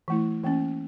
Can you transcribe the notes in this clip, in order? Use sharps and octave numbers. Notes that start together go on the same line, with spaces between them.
E3 A3 E4
E3 A#3 C#4